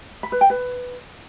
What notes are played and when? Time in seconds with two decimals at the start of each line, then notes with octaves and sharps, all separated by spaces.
0.23 B5
0.32 B4
0.41 G5
0.50 B4